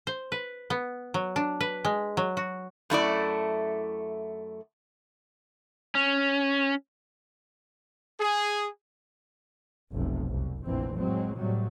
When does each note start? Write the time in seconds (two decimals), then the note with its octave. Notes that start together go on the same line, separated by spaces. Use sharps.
0.07 C5
0.32 B4
0.70 B3
1.14 F#3
1.36 D4
1.61 B4
1.85 G#3
2.17 F#3
2.37 F#4
2.90 F#2 A3 E4 D5
5.95 C#4
8.20 G#4
9.93 F1 B1 C3
10.29 C2
10.66 F1 A#1 D3 E3 C4
10.97 A2 F#3 G#3 C4
11.36 A2 C3 F#3 G3